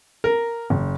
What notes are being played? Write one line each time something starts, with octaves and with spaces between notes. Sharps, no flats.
A#4
F#1